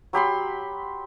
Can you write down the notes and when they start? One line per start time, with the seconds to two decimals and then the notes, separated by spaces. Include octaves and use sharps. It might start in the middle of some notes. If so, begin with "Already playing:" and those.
0.13 F#3 G4 B5 C6